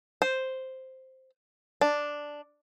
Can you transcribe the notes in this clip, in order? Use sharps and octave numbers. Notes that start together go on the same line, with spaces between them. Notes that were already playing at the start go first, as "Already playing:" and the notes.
C5
D4